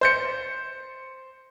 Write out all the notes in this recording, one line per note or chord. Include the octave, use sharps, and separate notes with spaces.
C5 G6 C#7